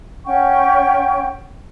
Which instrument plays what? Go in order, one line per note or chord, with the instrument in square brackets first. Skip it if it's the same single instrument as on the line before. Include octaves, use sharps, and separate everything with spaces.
[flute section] C#4 F#5 G5 C#6